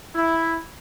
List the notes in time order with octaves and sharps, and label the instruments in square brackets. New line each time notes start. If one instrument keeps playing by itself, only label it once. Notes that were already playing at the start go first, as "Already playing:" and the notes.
[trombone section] E4